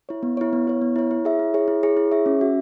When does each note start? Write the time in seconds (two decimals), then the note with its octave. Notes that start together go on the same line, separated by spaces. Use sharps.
0.09 E4 C#5
0.23 B3
0.37 E4 C#5
0.53 B3
0.67 E4 C#5
0.82 B3
0.96 E4 C#5
1.11 E4
1.25 G#4 C#5 E5
1.39 E4
1.54 G#4 C#5 E5
1.68 E4
1.83 G#4 C#5 E5
1.97 E4
2.12 G#4 C#5 E5
2.26 C#4
2.41 F#4 E5